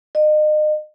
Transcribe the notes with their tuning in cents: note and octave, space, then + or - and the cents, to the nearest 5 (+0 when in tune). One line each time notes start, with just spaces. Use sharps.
D#5 -35